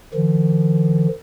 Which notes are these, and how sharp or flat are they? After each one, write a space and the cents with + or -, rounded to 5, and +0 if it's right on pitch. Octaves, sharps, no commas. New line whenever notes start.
D3 +45 F3 -40